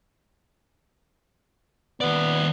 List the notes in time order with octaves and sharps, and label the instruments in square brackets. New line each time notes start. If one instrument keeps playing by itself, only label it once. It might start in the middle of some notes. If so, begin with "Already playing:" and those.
[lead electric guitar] D#2 D5 [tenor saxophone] B3